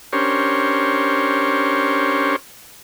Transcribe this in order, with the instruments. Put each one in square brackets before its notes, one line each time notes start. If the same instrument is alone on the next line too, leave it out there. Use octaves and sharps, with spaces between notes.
[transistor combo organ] C#4 D4 G4 A#4 C5 C#5